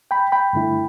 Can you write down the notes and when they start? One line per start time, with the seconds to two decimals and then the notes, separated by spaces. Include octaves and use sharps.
0.11 G5 B5
0.32 G5 B5
0.53 G2 D3 A3 E4